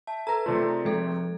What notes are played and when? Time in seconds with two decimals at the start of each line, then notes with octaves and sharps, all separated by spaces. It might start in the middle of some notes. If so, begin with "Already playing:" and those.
0.07 E5 A5
0.27 A4 B4 A#5
0.46 C3 A3 F4 D5
0.62 C4 D#4 G#4
0.85 F3 G#3 A4